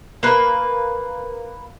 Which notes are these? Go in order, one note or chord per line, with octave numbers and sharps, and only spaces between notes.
A#3 B4